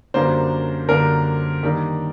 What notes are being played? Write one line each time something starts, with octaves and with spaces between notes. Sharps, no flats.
F#2 D3 G3 A#3 D4 C5
F#2 D3 G3 A#3 D4 A#4
D#3 G3 A#3 D4